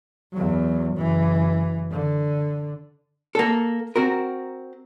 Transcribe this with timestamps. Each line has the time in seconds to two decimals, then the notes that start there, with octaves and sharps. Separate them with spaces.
0.33 E2 F#3
0.97 F#1 E3
1.91 D3
3.35 A#3 A4
3.96 C4 F#4 A#4